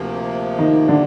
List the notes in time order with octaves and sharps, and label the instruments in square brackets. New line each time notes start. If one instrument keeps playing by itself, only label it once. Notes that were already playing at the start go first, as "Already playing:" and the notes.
Already playing: [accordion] D2 C3 F3 A#3
[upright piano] D#3 D#4
D3 D4